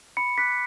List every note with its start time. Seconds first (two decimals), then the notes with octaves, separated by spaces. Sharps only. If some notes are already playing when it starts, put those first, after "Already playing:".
0.17 B5 C#7
0.37 D6 F#6 B6